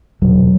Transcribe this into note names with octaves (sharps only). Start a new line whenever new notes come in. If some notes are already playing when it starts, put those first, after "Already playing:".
E2 B2 F#3